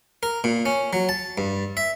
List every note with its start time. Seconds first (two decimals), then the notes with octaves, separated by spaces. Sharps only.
0.23 A#4
0.44 A#2
0.66 C#4
0.93 F#3
1.09 A5
1.38 G2
1.77 E5